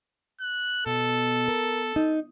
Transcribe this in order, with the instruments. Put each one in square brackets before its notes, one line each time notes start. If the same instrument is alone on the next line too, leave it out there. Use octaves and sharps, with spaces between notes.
[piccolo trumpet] F#6
[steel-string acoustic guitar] B2 [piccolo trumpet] A4
[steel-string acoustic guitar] A#4
D#4